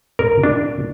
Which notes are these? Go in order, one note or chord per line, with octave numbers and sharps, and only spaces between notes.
A#4
D4